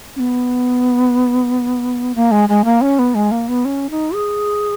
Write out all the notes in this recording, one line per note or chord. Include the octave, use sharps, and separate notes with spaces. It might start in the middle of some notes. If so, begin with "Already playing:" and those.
C#4
B3
A#3
G#3
G#3
A#3
C#4
B3
G#3
A#3
B3
C#4
D#4
G#4